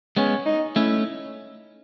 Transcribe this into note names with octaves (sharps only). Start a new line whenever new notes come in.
G#3 B3 C#4
D#4
A3 C#4 E4